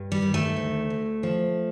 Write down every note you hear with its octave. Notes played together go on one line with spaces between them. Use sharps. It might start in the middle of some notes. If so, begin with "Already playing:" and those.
Already playing: G2
G3
D#3
A3
D2
D2
F3